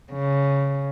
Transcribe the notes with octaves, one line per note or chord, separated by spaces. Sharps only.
C#3